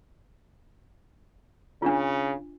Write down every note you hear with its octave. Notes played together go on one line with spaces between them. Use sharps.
C#3 D4 F4